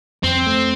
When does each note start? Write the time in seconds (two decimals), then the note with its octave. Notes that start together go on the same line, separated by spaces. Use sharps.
0.23 F2 C4
0.46 A3